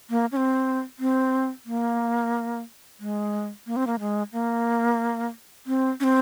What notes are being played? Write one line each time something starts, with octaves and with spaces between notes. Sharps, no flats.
A#3
C#4
C4
C4
A#3
G#3
A#3
C4
A#3
G#3
A#3
C4
C#4
C4